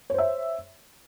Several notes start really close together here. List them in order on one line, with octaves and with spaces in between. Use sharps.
C#5 C5 E5